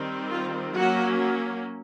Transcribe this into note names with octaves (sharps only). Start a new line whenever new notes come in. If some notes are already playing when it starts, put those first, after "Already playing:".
Already playing: D#3 G3 C4
F4
F#3 A#3 C#4 F#4